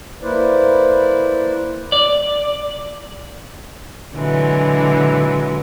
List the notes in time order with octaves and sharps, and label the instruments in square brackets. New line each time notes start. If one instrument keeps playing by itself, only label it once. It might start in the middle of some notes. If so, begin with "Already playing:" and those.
[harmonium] A#3 E4 B4 C5 D5
[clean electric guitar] D5
[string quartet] A#2 D3 E3 F#3 G#3